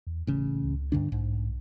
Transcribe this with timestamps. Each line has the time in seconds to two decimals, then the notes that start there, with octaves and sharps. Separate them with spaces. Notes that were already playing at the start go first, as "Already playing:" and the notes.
0.07 E2
0.27 D#1 A1 C#3
0.63 C#2
0.92 G2 D3 D4
1.12 B1 G#2